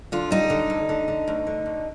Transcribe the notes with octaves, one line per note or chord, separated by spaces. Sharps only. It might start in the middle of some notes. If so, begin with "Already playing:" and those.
D3 F4
G3 D#4
D3
D2
D3
D3
D2
D3
D2